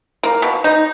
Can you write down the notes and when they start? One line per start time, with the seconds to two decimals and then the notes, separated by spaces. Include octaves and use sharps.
0.23 A#3
0.42 B2
0.64 D#4